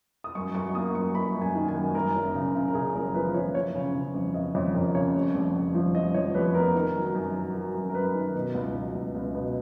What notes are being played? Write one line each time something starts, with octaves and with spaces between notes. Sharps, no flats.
D#6
F#2 C#6
F#2 C#6
A#3 D#6
F#2 C#6
F#2 B5
F#2
G#5
D#3
G#5
F#2
F#2 A#4
F#1
C#3
C#3
A#4
C#3 G#4
F#1 A#4
F3 B4
F3 C#5
F#1 C#5
C#3
C#3
F2
C#3 D#5
F2 C#5
F2 A#4
C#3 C#5
F1
F1
F1
F3
F3 D#5
F3 C#5
F1 B4
B3 A#4
D#3 A#4
F#3
F#2
F#3
F#3 A#4
F#2
A#4
F#2 B4
D#3
B2
C#2
F#3
C#2
C#2
B2